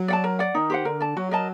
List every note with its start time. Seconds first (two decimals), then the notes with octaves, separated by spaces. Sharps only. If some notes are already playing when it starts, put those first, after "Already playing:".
Already playing: F#3
0.08 D5 F#5 A5
0.24 A#4
0.39 D5 F#5
0.54 D#3 D#4
0.70 G4 C5 F#5
0.85 D3 A#4
1.00 D5 A5
1.16 F#3 F#4
1.31 A#4 D#5 A5